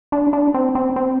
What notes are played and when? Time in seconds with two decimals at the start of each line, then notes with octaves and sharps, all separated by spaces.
0.12 D4
0.33 D4
0.54 C4
0.75 C4
0.96 C4